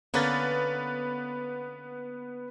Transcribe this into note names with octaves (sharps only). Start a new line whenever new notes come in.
D3 A#3 B3 C#4 B4 A6